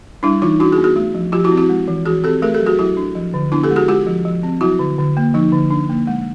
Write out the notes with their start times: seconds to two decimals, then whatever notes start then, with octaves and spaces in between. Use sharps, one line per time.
0.23 G3 D4 E4
0.42 E3 D#4 F4
0.60 D4 E4 F#4
0.72 F#4 G#4
0.78 B3
0.84 F#4 G#4
0.96 A3
1.15 F3
1.32 F3 F4 G4
1.44 E4 F#4
1.51 C4
1.57 E4 F#4
1.70 G#3
1.88 E3
2.05 E3 F#4 G#4
2.24 C4 G4 A4
2.42 A3 G#4 A#4
2.54 G4 A4
2.60 F#3
2.66 F#4 G#4
2.79 F#3 E4 F#4
2.97 D4
3.15 F3
3.34 D3
3.52 B3 D4 E4
3.63 G4 A4
3.71 G#3
3.76 F#4 G#4
3.88 G#3 F4 G4
4.06 F3
4.25 F3
4.43 C4
4.61 F#3 E4 F#4
4.79 D3
4.98 D3
5.17 A#3
5.34 F3 D#4
5.52 D3
5.71 D4
5.89 A#3
6.07 G#3